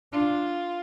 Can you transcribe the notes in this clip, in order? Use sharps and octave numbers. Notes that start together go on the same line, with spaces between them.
D4 F4